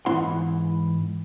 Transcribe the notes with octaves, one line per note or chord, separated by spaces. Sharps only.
G#2 E3 B3 E4 F#5 C6